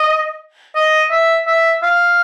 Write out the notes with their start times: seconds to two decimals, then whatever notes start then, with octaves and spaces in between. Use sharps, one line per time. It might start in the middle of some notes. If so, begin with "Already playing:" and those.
Already playing: D#5
0.75 D#5
1.11 E5
1.47 E5
1.83 F5